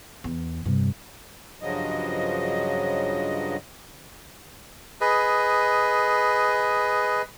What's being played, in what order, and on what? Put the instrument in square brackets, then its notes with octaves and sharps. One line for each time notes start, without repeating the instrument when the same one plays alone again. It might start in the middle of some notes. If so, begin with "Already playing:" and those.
[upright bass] E2
G2 C3
[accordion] G2 C#3 F3 F#3 D#5
[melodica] G#4 B4 D#5